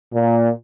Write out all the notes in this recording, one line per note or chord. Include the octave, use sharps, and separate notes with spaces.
A#2